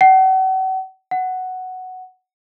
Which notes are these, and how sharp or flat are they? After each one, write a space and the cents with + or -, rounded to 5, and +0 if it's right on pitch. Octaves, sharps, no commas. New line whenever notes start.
F#5 +40
F#5 +5